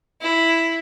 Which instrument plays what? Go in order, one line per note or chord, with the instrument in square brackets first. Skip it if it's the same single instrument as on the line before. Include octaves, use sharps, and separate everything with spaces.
[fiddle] E4